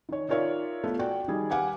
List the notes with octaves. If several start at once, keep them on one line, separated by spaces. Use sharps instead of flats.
D#3 C#5
D#4 F4 A#4 C#5 D5 E5
A3 B3 F4 B4
F#4 D5 G5
D#3 G3 G#4
G4 B4 F5 F#5 G#5 D6